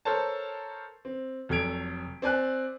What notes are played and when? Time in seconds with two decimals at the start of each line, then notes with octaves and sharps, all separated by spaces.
0.05 A4 A#4 C5 C#5 A5
1.05 C4
1.49 F1 F#3 A4 G#6 D7 F7
2.22 C4 D5 G#5 F#6